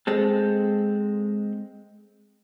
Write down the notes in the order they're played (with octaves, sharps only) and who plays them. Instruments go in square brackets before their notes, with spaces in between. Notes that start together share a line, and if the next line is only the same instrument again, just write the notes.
[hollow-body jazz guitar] G#3 C4 A4